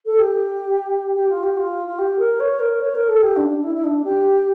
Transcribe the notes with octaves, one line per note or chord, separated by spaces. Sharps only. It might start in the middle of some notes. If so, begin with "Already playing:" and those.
A4
G4
G4
F4
G4
F4
F4
G4
A#4
C#5
A#4
C#5
A#4
A4
G4
D4
D4
E4
E4
D4
G4